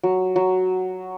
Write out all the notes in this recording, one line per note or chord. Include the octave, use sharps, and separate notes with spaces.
F#3
F#3